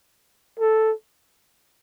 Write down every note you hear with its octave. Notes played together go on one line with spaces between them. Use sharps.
A4